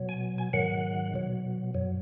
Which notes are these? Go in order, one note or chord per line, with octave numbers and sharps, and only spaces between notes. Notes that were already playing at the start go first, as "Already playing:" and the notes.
Already playing: B2 F#3
G#5
G#5
G#2 D#3 F#3 F#5
B2 F#3
F#2 F#3